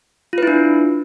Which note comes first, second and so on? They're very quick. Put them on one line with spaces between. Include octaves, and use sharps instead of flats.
F4 B4 E4 D4